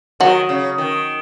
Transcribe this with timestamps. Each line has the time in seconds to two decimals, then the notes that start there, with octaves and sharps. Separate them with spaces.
0.20 D#3 F#3
0.49 C#3
0.78 D#3